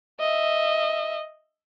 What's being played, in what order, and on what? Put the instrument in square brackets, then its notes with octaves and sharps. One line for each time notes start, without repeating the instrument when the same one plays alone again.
[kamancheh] D#5 E5